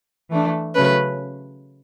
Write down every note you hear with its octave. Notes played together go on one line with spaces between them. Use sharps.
E3 A3 D4
C#3 F#3 A3 C#4 B4